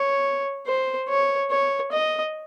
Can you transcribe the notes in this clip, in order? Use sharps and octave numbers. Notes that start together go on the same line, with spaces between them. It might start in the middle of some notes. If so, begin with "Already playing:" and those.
Already playing: C#5
C5
C#5
C#5
D#5